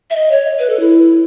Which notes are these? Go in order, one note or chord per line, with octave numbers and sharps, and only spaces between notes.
E5
D#5
C#5
B4
A4
E4